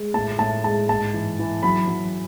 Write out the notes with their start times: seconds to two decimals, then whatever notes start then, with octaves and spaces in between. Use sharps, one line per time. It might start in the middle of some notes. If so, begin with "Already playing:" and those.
Already playing: G#3
0.14 A2 A5
0.39 A2 A5
0.64 G#3 A5
0.89 G#2 A5
1.14 E3
1.39 E3
1.63 F#3 B5
1.87 F#3